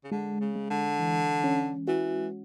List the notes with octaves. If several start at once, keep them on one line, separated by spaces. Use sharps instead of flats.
C#3
D3 G#3
C#3
G#3
D3
E3
C#4
E3 F#4